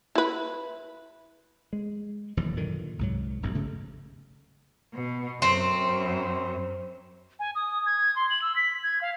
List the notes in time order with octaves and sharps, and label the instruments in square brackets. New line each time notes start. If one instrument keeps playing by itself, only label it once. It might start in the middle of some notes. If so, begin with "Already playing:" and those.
[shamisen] E4 B4
[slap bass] G#3
E1 D#2 E3 F#3
F#2 A#2 D3 D#3
C2 G#2 F#3
F1 B1 G2
G#1 D2 C#3 A3
[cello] B2
[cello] F#2 [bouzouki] C4
[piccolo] G#5
D#6
G#6
C6
F#7
E6
B6
G#6
F5